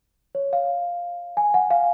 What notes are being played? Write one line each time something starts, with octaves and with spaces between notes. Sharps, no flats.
C#5
F5
G#5
F#5
F5